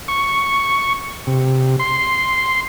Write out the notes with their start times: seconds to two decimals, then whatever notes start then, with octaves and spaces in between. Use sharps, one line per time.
0.08 C#6
1.27 C3
1.80 C6